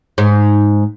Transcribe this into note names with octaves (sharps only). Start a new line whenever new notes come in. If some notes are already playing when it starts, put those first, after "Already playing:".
G#2